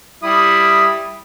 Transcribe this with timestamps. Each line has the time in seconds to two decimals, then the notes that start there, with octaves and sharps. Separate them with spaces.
0.23 G3 E4 D#6